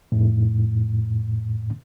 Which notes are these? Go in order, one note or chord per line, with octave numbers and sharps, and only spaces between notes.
F2 A2